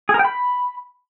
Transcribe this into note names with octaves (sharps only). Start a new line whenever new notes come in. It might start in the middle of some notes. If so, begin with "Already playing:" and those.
G#4
A#4
G5
B5